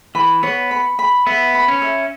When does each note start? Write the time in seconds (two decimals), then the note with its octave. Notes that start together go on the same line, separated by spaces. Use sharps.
0.15 E3 B5
0.43 B3 C#5
0.71 B5
0.99 B5
1.27 B3 E5
1.54 B5
1.68 C#4
1.82 E5